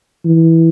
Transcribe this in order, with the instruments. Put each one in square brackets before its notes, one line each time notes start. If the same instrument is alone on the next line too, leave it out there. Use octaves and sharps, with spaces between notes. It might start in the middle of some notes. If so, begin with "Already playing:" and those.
[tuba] E3